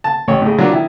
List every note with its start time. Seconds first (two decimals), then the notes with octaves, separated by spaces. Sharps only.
0.04 A5
0.28 A1 C#5
0.42 A2 C#3
0.59 F#3 A#3 D4 F4
0.71 D#3 E4